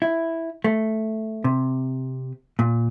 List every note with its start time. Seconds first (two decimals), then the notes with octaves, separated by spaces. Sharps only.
0.02 E4
0.64 A3
1.44 C3
2.59 A#2